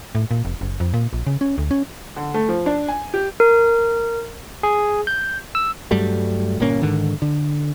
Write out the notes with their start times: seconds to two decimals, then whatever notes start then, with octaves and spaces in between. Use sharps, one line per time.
0.15 A2
0.31 A#2
0.45 F1
0.61 F#1
0.80 F2
0.94 A#2
1.13 A#1
1.27 C#3
1.41 C#4
1.58 D2
1.71 C#4
2.16 D3
2.34 A3
2.49 F3
2.66 D4
2.88 G#5
3.14 G4
3.40 A#4
4.63 G#4
5.07 G6
5.55 E6
5.91 G2 F#3 G3 A3
6.60 G1 A#2 A#3 C#4
6.82 G#2 D3 D#3
7.22 D3